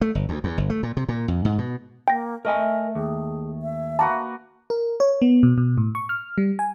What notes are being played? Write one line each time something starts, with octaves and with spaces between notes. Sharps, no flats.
A3
G1
D2
E2
G1
A3
A#2
C3
A#2
F2
G#2
B2
A#3 G5 A#6
A3 A#4 D#5 E5 G#5
D#2 G#4
E5
A#3 F#4 B4 A5
A#4
C#5
B3
B2
B2
A2
C#6
F6
G3
G#5